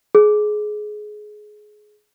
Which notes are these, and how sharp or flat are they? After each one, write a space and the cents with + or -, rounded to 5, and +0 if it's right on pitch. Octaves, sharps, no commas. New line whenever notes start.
G#4 +20